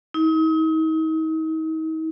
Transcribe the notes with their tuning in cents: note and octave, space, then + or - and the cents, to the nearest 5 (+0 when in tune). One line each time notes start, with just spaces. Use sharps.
D#4 +40